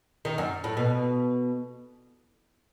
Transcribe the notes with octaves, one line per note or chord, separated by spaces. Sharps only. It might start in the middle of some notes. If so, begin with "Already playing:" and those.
D#3
F#2
A2
B2